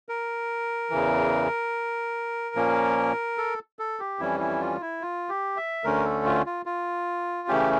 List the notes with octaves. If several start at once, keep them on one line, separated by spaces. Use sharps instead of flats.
A#4
E2 C#3 E3
A#2 F3 A#3 C#4
A4
A4
G4
F2 E3 G3 C#4 E4
E4
F4
E4
F4
G4
E5
D2 D3 A3 C#4 A#4
A4
F4
F4
F4
C#3 E3 A3 C#4 G4